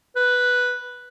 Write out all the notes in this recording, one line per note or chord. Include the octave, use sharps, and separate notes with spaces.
B4